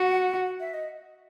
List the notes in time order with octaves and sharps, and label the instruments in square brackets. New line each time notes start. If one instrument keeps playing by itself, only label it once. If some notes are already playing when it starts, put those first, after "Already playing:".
Already playing: [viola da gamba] F#4 [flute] F#5
[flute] E5
D#5